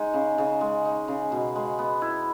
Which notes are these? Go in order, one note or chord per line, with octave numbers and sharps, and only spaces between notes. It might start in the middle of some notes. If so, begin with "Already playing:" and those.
Already playing: G#3 D#4
C#3
C#3
G#3
D#4
C#3
B2
G#3
B3
E4